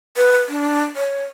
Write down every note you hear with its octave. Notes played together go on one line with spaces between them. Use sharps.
B4
D4
C#5